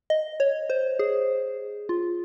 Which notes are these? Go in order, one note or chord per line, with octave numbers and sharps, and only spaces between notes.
D#5
C#5
C5
G#4
F4